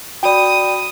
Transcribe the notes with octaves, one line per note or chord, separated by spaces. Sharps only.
F#4 D5 G5 B5 D#6